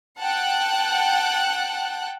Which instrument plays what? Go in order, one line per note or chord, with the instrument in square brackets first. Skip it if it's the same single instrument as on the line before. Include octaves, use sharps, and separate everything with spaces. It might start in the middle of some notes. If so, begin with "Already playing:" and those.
[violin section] F#5 G5 A5 F#6